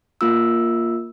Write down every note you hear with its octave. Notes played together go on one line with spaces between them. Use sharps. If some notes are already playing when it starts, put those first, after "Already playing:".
A#3 F4 E6